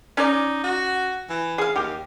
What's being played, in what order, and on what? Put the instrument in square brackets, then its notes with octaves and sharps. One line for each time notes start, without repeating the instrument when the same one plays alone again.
[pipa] C#4 D5 [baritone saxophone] D#4
[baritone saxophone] F#4
E3
[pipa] G#4 F5
[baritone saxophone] D#2 [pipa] G4